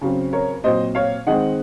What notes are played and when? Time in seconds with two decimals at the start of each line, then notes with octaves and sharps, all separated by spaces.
0.01 C#3 F#3 C4
0.33 A#4 C#5
0.64 A#2 F#3 C4 C5 D#5
0.95 C#5 F5
1.26 D#3 G#3 C4 D#5 F#5